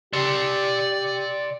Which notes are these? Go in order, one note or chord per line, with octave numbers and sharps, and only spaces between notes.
G4 D5 C6